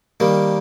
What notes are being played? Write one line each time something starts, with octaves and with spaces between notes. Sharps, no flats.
D#3 G3 A#3